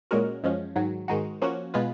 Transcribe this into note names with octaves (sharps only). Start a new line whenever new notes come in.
A#2 G#3 C#4 F#4 A#4
F#2 F3 G#3 C#4
G#2 D#3 F#3
G#2 D#3 G#3 D#4 F#4
F3 A#3 C#4 F#4
B2 G#3 B3 F4 B4